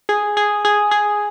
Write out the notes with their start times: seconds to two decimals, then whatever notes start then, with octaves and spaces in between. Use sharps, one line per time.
0.09 G#4
0.37 G#4
0.65 G#4
0.91 G#4